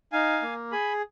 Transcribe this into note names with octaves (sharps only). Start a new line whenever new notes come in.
D#4 F5 G#5
A#3
G#4 G#5 B5